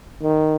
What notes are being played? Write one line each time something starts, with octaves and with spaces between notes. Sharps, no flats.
D#3